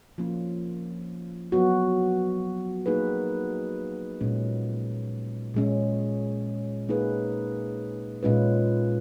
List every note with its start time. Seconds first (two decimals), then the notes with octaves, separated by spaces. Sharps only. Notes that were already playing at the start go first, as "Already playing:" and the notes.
0.18 F3 A#3 C#4 F4
1.52 F#3 B3 F#4
2.86 A#3 D#4 G#4 B4
4.21 A#2 G#3 C#4
5.54 A#2 G#3 C#4
6.89 A#3 D#4 G#4 B4
8.23 A#2 G#3 C#4 F4 B4